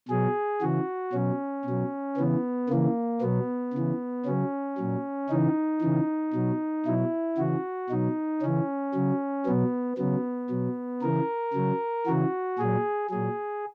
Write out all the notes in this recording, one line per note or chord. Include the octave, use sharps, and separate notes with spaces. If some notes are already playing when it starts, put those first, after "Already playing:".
B2 F#3 G#4
C#3 E3 F#4
B2 F#3 C#4
B2 F#3
C#3 E3 B3
C#3 E3 A#3
B2 F#3 B3
C#3 E3
C#3 F#3 C#4
A#2 F#3
C#3 E3 D#4
C#3 E3
B2 F#3
B2 F#3 E4
C#3 E3 F#4
B2 F#3 D#4
C#3 E3 C#4
C#3 F#3
B2 F#3 B3
C#3 F#3 B3
B2 F#3
C#3 E3 A#4
C#3 F#3
C#3 E3 F#4
A#2 F#3 G#4
A#2 F#3 G#4